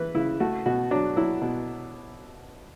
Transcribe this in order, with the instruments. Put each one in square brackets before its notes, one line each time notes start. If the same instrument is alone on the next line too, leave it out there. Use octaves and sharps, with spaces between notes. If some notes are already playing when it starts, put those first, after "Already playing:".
Already playing: [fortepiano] E3 B4
C#3 E4
A3 F#4
B2 F#4
F#3 D4
F#3 E4
B2